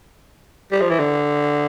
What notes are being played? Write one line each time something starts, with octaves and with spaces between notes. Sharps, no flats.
G3
F3
E3
D3